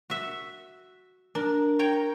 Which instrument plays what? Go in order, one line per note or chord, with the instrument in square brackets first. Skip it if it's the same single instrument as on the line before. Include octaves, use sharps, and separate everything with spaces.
[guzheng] F#4 E5
[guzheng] D4 [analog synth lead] A#4
[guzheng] C#5 G5 A#5